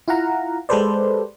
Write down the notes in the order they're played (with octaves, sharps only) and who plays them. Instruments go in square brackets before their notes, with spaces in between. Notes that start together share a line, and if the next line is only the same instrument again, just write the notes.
[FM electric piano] E4 F4 F5 F#5 A#5
G#3 G4 A4 B4 C5 D5